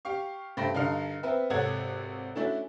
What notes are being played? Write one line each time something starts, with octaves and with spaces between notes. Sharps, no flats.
G4 F5 C#6
G2 A3 C5 G5 B5 A#6
G2 D3 D#4 A#4 F5 F6
B3 C4 B4 E5
G#1 C3 A4 C#5 F#5 G#6
A3 C#4 D4 E4 F#4 A4